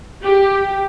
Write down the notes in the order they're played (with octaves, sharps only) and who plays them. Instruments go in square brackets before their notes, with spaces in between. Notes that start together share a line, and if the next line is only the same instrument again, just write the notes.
[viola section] G4